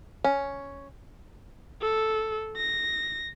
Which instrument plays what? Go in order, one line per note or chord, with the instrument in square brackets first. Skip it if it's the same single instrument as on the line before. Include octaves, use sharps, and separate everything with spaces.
[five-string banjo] C#4
[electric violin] A4
A#6